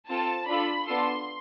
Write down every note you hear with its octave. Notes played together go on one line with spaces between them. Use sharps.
C4 F4 A4 A5
D4 F4 A4 B5
B3 D4 F4 A4 C6